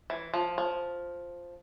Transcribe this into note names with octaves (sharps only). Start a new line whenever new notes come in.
E3
F3
F3